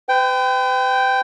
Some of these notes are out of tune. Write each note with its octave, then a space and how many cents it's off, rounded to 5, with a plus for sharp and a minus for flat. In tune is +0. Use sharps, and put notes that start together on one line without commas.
B4 +45 G5 +0